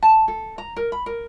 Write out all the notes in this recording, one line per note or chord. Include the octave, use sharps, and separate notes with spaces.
A5
A4
A#5
A#4
B5
A#4